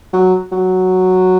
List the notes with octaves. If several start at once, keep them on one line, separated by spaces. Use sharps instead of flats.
F#3
F#3